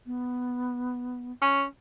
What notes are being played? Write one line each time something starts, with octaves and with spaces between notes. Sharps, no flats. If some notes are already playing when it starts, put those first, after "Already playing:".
B3
C#4